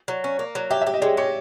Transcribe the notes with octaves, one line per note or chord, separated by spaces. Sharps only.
F#3
C#4
A#3
F#3
G4 E5
E5
G4
D#5
G#3 C#5 D5
G4 C#5